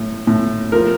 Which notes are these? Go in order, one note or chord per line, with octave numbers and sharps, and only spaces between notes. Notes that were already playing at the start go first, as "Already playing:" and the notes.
Already playing: A2
A2
F3 A#4